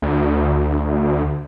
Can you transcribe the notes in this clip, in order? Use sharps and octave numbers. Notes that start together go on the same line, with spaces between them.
D2